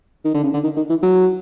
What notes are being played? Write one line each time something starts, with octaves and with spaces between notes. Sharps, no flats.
D#3
D3
C#3
D3
D#3
D#3
E3
F#3